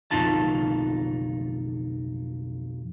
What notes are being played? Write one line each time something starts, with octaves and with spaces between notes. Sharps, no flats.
B1 F2 D#4 F4 A5